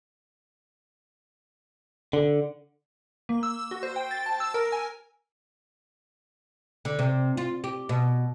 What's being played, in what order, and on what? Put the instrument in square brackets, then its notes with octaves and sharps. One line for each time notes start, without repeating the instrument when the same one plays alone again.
[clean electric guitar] D3
[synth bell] A#3
E6
F#4
C5
G5
A6
A5
E6
A#4
G#5
[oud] D3
C3
F4
G4
B2